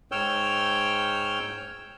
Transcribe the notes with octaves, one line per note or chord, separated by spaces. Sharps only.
G#2 C#5 G5 E6 F6 G6